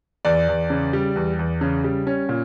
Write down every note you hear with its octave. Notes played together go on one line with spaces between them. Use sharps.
E2 D5
E2
C#3
G3
E2
E2
C#3
G3
C#4
A#2